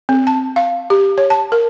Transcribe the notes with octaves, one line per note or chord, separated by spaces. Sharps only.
C4
A5
F5
G4
C#5
A5
A#4